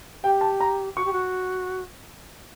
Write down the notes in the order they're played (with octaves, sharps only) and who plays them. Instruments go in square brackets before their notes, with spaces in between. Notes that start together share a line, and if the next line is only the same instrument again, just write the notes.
[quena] G4 [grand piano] G5
[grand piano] A5
A#5
[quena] F#4 [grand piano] C#6
[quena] G4
F#4